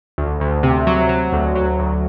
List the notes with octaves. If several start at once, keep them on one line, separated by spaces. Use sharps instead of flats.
D2
D2
C3
F#3
F#3
D2
F#3
D2